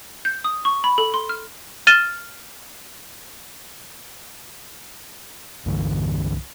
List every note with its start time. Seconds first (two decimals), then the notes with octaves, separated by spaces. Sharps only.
0.25 G6
0.44 D#6
0.65 C#6
0.84 B5
0.98 A4
1.14 C6
1.29 F6
1.87 F6 A6 D#7 E7 G7
5.66 C2 G2 D3 E3